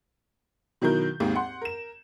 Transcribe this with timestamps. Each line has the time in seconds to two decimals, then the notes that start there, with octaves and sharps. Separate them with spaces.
0.82 B2 D#3 F#3 E4 A#4 G6
1.20 G#1 D#2 G#2
1.35 F#5 C6
1.61 A#4 E7